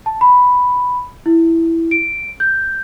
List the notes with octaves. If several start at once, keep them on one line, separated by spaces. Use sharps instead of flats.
A5
B5
E4
D7
G6